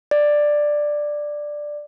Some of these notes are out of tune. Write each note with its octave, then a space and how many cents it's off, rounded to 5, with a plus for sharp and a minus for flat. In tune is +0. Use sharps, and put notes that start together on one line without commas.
D5 +5